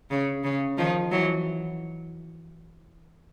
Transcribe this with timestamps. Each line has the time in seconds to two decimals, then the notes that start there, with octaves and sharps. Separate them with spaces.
0.11 C#3
0.44 C#3
0.78 D#3 F3
1.11 E3 F#3